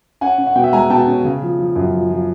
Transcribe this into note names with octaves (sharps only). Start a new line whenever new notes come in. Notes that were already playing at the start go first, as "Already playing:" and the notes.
C#4 F#5 G#5
C#4
F#5
B2 G5
E5 F#5
G#3 G#5 A#5
B2 G5 A5
C#4
C#3
F3
F3
F#2
F3
F3